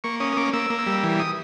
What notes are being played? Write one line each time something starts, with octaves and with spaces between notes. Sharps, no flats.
A#3 C#6
C#4 D#6
D#6
A#3 D6
A#3 E6
A#3
E6
G3
E3
D#6